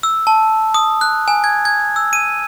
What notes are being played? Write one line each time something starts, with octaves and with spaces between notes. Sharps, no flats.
E6
A5
D#6
F#6
G#5
G#6
G#6
E6
D#7